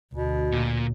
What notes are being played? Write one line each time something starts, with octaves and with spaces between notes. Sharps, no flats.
D2 B2
A#2